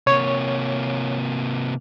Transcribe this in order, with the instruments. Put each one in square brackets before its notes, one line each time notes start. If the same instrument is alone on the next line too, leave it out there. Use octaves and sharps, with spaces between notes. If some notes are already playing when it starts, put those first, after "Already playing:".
[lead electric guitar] C3 A#3 [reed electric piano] C#5